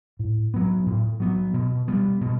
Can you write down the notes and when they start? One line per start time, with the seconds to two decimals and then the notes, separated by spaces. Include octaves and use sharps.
0.19 A2
0.54 F#3 B3
0.86 A2
1.20 F#3 B3
1.54 B2
1.88 G3 B3
2.21 B2